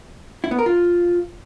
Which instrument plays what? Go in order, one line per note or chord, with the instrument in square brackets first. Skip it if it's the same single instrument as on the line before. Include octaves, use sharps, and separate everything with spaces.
[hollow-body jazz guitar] E4
B3
A#4
F4